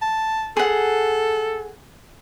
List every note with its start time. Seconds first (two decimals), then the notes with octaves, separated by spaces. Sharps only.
0.02 A5
0.57 G#4 A4 F#5